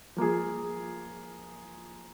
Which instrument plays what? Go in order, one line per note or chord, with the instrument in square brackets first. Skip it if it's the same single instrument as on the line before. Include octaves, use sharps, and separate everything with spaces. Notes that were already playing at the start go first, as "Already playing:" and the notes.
[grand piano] F3 A#3 F4 G#4